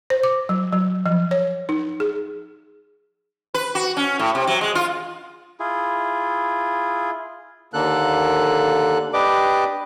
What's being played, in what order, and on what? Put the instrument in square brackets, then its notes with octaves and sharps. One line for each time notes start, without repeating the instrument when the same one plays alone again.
[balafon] C5
D6
F#3
F#3
F3
C#5
D#4
G#4
[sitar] B4
F#4
C#4
A2
C3
F#3
G#3
F4
[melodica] E4 F4 G#4
[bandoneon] D#2 D3 A#3 A4 F#6
D4 G4 B4 D5 D#5 D6